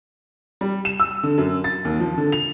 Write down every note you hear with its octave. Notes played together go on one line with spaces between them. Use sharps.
G3
E7
E6
D3
F#2
A6
D#2
F3
D3
F7